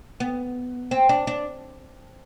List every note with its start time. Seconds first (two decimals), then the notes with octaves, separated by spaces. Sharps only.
0.20 B3
0.91 C4
1.09 D4
1.27 D4